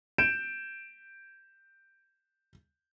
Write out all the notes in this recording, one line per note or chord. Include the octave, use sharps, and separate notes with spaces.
G6 D7 E7